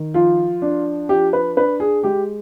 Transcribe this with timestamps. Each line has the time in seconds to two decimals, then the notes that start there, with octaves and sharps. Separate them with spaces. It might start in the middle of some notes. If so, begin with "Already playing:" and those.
Already playing: D#3
0.14 F3 F4
0.62 D4
1.09 F3 G4
1.33 B4
1.57 D4 B4
1.80 G#4
2.04 G#3 G4